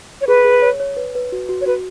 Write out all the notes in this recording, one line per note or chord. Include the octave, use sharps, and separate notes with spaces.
C#5
G#4 B4
G#4
C#5
C#5
B4
B4
F#4
F#4
C#5
F#4 B4